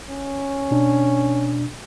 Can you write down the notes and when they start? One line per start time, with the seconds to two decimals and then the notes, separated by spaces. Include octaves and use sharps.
0.10 C#4
0.71 B2 D4